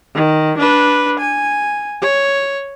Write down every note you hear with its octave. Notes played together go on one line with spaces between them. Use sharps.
D#3
D4 B4
G#5
C#5